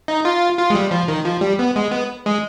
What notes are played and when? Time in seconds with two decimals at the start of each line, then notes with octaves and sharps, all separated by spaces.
0.08 D#4
0.25 F4
0.58 F4
0.70 G#3
0.75 G3
0.91 F3
1.08 D#3
1.25 F3
1.41 G3
1.59 B3
1.76 G#3
1.91 B3
2.26 G#3